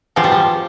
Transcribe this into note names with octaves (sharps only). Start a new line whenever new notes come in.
B2 F3 G#3 C4 G4
G3
F3